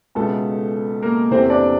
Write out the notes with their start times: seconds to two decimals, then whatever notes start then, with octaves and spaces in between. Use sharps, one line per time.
0.15 C#2 B2 G#3 A3 B3 A4
1.02 A#3 A#4
1.31 E2 C3 E3 A3 C4 C5
1.50 D4 D5